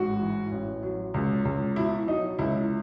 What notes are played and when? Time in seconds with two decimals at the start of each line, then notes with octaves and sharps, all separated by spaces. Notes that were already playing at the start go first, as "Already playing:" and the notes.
Already playing: A1 G#2 F#4
0.20 E3
0.52 A1
0.83 F#3
1.14 C#2
1.45 C#2
1.76 B2 E4
2.07 F#3 D#4
2.39 C#2 E4